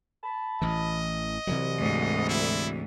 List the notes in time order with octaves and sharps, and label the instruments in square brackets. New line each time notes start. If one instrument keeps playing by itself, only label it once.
[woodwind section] A5 B5
[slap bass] A1 E3 [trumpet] D#5
[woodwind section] C2 [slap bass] C3 E3 F#3
[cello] D2 G#2
[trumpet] E4